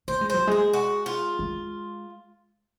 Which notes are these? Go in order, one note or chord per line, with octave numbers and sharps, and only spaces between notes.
A#3 C5
G#3
F#3 C5
G#3 G#4
F#4
F4
G#3